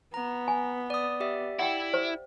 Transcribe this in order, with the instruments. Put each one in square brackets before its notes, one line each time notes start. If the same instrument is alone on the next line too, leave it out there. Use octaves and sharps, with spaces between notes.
[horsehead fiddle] B3 [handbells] A#5
[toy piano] G#5
[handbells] D5 D#6
G4 D5 E5
[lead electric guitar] E4 [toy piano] F#5 G5
[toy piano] C5